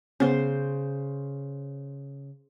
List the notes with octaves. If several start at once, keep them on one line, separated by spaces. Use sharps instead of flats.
C#3 B3 C#4 C5